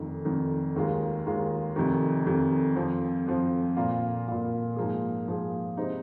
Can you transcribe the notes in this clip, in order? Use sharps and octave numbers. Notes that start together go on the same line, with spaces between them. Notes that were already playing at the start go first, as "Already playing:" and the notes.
Already playing: F1 F2 D#3
F1 F2 D#3
D#2 D#3 G#3 F4
D#2 D#3 G#3 F4
F1 F2 C3 D#3
F1 F2 C3 D#3
F2 F3 C4
F2 F3 C4
A#2 A#3 F4
A#2 A#3 F4
G#2 F3 A#3 G#4
G#2 F3 A#3 G#4
C3 G#3 D#4 C5